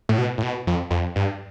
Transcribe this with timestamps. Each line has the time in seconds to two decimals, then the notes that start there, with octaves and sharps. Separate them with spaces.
0.09 A2
0.18 B2
0.38 A2
0.43 B2
0.67 F2
0.91 F2
1.16 G2